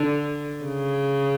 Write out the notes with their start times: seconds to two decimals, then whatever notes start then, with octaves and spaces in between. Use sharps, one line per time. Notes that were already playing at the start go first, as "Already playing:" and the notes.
Already playing: D3
0.64 C#3